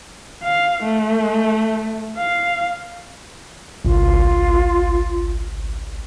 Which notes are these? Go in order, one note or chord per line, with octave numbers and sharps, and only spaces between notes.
F5
A3
F5
G#1 C#2 F4